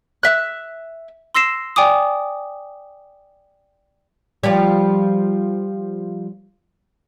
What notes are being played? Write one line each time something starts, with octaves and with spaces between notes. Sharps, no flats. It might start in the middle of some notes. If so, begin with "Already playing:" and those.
E5 F#6
C6 E6 A#6 C7 E7
D5 G5 G#5 D6 D#6
F3 G3